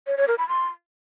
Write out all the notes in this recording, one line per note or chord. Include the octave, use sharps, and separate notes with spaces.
C#5
C#5
A#4
B5
C6